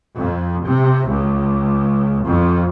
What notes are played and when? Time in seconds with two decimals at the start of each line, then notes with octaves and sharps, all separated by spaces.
0.15 F2
0.66 C3
1.09 C#2
2.23 F2